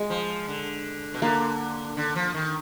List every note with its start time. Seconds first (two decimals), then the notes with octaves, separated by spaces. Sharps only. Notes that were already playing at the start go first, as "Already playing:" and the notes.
Already playing: G#3
0.10 F3
0.48 D3
1.14 B2
1.22 D3 A#3
1.97 D3
2.16 F3
2.34 D#3